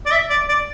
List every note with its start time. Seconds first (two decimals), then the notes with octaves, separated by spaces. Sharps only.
0.06 D5
0.12 E5
0.30 D5
0.48 D5